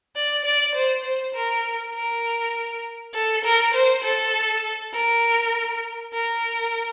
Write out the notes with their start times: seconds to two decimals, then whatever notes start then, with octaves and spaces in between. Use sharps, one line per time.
0.15 D5
0.45 D5
0.75 C5
1.05 C5
1.35 A#4
1.95 A#4
3.15 A4
3.45 A#4
3.74 C5
4.04 A4
4.94 A#4
6.13 A#4